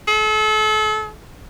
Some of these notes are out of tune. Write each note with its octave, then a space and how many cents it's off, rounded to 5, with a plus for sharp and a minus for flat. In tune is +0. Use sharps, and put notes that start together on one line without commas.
A4 -40